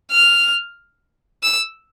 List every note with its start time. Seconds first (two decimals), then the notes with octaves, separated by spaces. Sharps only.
0.12 F6
1.43 E6